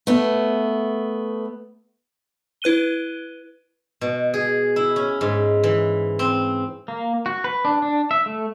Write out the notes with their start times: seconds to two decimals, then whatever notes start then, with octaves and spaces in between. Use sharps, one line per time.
0.07 A3 B3
2.62 E4 B4 F#6 D#7 G7
4.01 B2
4.34 G#4
4.76 E4
4.96 C#4
5.21 G#2
5.64 E3
6.19 C4
6.88 A#3
7.26 F#4
7.44 B4
7.65 D4
7.82 D4
8.11 E5
8.26 A3